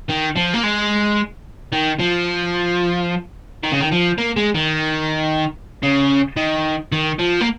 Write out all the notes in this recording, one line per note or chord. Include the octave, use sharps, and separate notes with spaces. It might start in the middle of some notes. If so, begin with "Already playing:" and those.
D#3
F3
A#3
G#3
D#3
F3
D#3
C#3
D#3
F3
A#3
G#3
D#3
C#3
D#3
D#3
F3
A#3